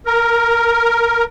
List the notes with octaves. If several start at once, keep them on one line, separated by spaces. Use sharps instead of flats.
A#4